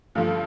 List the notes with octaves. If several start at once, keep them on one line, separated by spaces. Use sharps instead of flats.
G2 D3 F3 A3